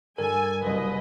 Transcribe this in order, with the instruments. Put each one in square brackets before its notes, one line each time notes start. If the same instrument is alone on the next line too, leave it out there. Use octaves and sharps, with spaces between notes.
[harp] G2 D3 [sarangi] A4 [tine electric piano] A#4 [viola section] G#5
[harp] F#1 C2 [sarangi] B4 [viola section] D#5